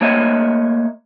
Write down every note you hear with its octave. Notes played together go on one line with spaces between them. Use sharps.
A3 A#3 C#5 D#5 E5